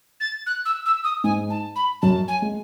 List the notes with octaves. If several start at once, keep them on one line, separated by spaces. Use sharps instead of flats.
A6
F#6
E6
E6
D#6
G#2 G#3 G#5
A5
B5
F#2 F#3 A5
G#5
G#3